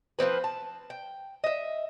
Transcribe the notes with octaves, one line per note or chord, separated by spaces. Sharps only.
F3 G3 C4 B4
A5
G5
D#5 E5